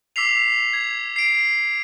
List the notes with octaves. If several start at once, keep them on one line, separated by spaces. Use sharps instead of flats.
D6 E6 B6 C7 F7
G#6
C7 D7